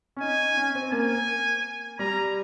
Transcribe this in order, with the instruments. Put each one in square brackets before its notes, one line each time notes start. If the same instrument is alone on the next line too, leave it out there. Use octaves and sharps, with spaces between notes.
[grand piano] C#4
[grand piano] D#4 [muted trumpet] G#5
[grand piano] C#4
C4
[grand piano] A#3 [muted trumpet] G#5
[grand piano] G3 [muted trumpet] A#5